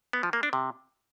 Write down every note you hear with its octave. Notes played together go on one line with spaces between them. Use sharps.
B3
F3
A#3
D4
C3